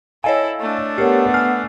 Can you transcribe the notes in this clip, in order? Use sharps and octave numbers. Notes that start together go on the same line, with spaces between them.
E4 A4 C#5 D#5 F5 G#5
A3 D4
B3 G4 A#4 C#5 F6 C7 C#7
G#5 F6 F#6 C7